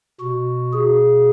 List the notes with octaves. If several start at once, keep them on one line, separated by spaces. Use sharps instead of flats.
B2 F#4
G#4